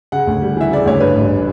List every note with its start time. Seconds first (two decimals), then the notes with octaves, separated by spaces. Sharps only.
0.12 C#3 F#5
0.27 D2
0.42 G3
0.57 E3 E5
0.72 C#3 D5
0.85 D2 C#5
1.00 G2 B4
1.16 A1